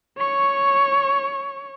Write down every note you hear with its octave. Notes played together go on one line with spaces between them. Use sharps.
C#5 C#6